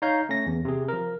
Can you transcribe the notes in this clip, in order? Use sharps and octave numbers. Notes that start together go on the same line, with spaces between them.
D#4 C#5 F5 G6
A3 C#4 A#6
E2
C3 G#4
F3 A#4